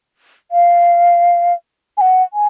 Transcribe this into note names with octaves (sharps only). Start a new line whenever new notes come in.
F5
G#5
F#5
G#5